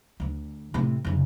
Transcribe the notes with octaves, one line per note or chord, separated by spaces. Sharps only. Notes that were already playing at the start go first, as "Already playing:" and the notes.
D2 D3
A2 C3
F1 C#3